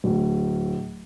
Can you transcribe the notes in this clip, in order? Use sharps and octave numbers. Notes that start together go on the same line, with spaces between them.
D1